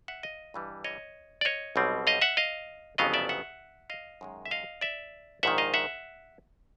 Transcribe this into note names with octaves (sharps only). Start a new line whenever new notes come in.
E5 F#5
D#5 F5
G2 E3 G3
C#5 D#5
D5
C#5 D#5
B1 B2 G3 C4
D#5 F5
E5 F#5
D#5 F5
G1 F2 C#3 F#3 B3 D#5 F5
D5 E5
E5 F#5
D#5 F5
F#2 D#3 G#3
E5
D#5 F5
D5 E5
A#1 G#2 D#3 E5 F#5
D#5 F5
E5 F#5